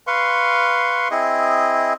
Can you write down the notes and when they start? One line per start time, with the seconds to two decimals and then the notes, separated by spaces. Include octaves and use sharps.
0.07 B4 F5 C6 C#6
1.11 C4 E4 G#4 D#5